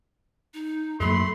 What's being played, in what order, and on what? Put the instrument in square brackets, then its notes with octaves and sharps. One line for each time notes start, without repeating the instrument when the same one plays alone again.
[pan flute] D#4
[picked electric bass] F#2 F#3 A#3 [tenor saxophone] A3 [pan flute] B5 [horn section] C6